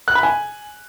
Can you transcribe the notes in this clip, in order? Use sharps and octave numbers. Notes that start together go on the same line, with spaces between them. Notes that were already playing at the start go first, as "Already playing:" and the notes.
F#6
B5
G#5